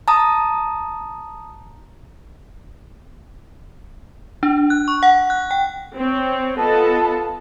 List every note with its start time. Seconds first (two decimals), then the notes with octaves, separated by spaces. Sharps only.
0.08 A5 A#5 D#6
4.43 D4
4.70 F#6
4.88 C#6
5.03 F#5
5.30 F#6
5.51 G5
5.96 C4 C#5
6.58 B3 F4 A4 D#5 A5